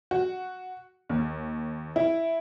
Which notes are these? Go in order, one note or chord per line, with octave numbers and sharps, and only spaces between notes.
F#4
D#2
E4